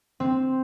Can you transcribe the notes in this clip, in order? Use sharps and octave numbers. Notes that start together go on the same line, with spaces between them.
C4